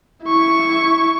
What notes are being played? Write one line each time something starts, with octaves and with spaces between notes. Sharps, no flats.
E4 C#6